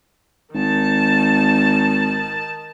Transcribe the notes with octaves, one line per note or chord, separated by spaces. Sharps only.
G#1 D#3 A5